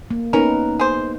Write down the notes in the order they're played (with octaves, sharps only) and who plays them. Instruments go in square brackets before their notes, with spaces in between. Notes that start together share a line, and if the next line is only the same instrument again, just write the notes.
[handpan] A#3
[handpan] B3 D#4 B4 [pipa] C#4 A#4
[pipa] G#4 C5